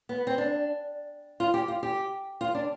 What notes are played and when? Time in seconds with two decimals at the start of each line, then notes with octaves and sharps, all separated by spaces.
0.09 B3
0.27 C4
0.38 D4
1.40 F4
1.54 G4
1.68 F4
1.83 G4
2.41 F4
2.55 D4